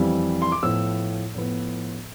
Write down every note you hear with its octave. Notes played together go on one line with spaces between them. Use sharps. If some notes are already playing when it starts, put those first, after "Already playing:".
Already playing: F2 E3 G3
C6
D6
A2 F3 B3 E6
A2 F3 B3